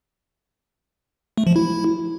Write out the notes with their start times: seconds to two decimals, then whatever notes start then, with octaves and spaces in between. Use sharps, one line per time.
1.38 A3
1.47 F3
1.56 E4